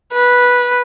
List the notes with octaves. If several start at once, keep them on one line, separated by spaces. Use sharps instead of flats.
B4